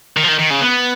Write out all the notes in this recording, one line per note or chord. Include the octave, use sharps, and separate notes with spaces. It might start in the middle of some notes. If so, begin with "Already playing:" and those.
D#3
F3
D#3
D#3
C#3
B3